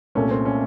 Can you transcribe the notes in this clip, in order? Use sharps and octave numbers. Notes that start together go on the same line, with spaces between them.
C2 A#2 A3 C#4
C4
C#4